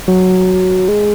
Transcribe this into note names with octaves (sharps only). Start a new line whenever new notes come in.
F#3
G#3